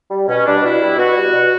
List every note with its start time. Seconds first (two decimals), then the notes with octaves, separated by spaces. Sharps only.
0.10 G3
0.28 B2 C#4
0.45 G3 D4
0.63 B2 E4
0.81 G3
0.98 B2 F#4
1.16 G3
1.33 B2